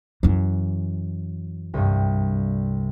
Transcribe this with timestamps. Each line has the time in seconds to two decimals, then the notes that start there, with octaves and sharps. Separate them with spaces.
0.23 F#2 E3
1.74 C2 G2